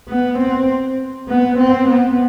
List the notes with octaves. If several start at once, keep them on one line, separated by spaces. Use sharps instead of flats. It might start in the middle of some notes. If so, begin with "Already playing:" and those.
B3
C4
B3
C4
B3